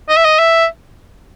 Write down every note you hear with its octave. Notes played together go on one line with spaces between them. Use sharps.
D#5
E5
D#5
E5